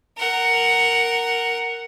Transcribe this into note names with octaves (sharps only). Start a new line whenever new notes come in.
A#4 F#5